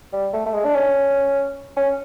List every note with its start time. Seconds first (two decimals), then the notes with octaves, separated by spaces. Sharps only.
0.13 G3
0.33 A3
0.46 A3
0.54 G#3
0.65 D4
0.75 C#4
1.77 C#4